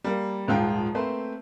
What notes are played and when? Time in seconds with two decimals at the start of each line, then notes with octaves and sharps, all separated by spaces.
0.04 G3 A#3
0.48 D#1 G#2 F3 F4 G5
0.94 A3 A#3 C4 B4 C5